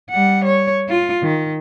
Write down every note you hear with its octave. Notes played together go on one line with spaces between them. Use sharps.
G3 F#5
C#5
F4
D#3